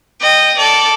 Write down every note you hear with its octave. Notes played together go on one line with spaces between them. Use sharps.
D#5 G5
A4 D5